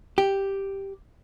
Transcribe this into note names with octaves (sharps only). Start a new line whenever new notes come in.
G4